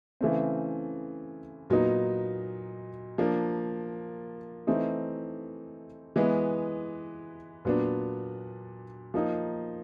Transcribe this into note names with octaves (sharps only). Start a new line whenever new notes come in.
C#3 E3 A3 C4
A#2 F#3 B3 D#4
F3 A#3 D4
E3 A3 C4 D#4
E3 G#3 B3
A#2 F#3 B3 D4
F3 A#3 D#4